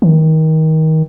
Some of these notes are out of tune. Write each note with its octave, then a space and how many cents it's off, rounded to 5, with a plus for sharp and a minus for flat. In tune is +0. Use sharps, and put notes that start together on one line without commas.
D#3 +25